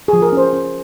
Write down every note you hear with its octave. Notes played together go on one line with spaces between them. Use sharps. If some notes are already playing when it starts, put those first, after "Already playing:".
F3 G#4
A#4
C#4 C5
C#4